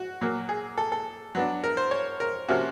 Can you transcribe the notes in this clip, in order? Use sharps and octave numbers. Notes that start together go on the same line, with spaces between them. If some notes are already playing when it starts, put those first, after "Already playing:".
Already playing: F#4
A#2 F#3 A#3
G#4
A4
A4
F#3 B3 D4
A#4
C5
C#5
A#4
C3 F3 A#3 C#4 E4 F#4